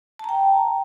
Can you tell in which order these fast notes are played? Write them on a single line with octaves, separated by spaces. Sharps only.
A5 A#5 G5